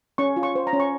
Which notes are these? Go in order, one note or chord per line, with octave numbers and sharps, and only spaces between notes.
C#4 C#6
F4
C#6
C5
A#5
C#4
C#6